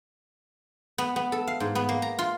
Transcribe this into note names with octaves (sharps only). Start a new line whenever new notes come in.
B3
B3
A4
F5
G#2
B3
A#3
A#5
F4